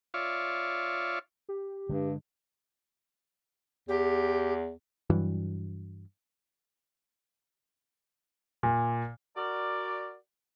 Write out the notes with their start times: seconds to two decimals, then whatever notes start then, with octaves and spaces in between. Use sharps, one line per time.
0.14 F4 C#5 D5 E5 F5
1.49 G4
1.89 G2 D3 G#3
3.89 E2 G4
5.10 G2 E3 F#3
8.63 A#2
9.37 F#4 A#4 D5